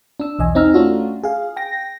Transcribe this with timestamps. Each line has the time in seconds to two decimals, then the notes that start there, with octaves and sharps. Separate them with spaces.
0.20 D4 E6
0.39 B1 E2 D#5 G#5
0.55 C4 D#4 A#5 E6 F6
0.74 A3 C#4 D4 F4 F#4
1.24 G#4 F5
1.57 G5 A#6